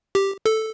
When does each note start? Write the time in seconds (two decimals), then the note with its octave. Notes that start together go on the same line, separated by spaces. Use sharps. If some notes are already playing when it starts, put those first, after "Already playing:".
0.15 G4
0.46 A4